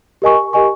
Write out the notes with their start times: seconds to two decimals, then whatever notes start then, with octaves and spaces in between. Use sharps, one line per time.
0.22 G4 A#4 D#5 G#5 C#6
0.53 G4 A#4 D#5 G#5 C#6